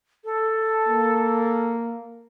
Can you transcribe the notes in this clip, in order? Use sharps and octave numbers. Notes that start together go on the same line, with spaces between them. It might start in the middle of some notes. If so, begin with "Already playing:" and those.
A4
A#3